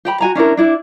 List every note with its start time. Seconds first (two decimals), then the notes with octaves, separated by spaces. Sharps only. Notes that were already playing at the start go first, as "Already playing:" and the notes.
0.05 G4 G5 B5
0.21 F#4 G#5 A#5
0.35 C#4 D4 E4 A#4
0.57 D4 E4 D5